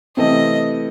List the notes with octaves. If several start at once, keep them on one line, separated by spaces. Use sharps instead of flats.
C3 E3 A3 C4 D#5